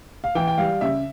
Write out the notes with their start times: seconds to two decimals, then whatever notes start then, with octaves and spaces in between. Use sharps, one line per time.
0.24 F5
0.35 E3 G5
0.48 G5
0.58 G3 F5
0.81 C#3 E5